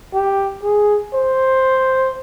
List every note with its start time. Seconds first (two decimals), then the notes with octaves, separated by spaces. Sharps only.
0.14 G4
0.63 G#4
1.14 C5